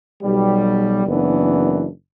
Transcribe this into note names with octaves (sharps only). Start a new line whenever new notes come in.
B1 B2 G3
F#1 F#2 E3 B3 D4